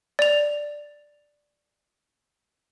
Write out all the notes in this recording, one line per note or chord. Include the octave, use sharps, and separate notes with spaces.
D5 F7